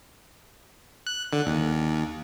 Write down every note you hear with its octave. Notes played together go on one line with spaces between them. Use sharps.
F#6
D3
D#2